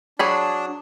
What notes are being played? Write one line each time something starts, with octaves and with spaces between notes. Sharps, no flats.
F#3 D4 G#4 B5